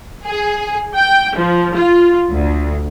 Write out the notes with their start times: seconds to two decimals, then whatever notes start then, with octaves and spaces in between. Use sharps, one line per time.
0.25 G#4
0.95 G5
1.36 F3
1.75 F4
2.33 D2